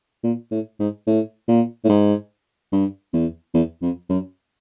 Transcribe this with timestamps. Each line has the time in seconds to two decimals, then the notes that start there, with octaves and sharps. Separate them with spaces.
0.24 A#2
0.51 A2
0.79 G#2
1.07 A2
1.48 A#2
1.85 A2
1.89 G#2
2.73 G2
3.14 E2
3.54 E2
3.82 F2
4.09 F#2